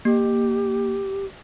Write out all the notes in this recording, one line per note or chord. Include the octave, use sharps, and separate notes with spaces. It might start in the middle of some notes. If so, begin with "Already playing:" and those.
A#3 G4